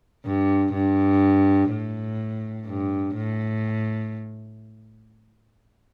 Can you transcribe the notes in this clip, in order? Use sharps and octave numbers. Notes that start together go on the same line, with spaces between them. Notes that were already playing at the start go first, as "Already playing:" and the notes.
G2
G2
A2
G2
A2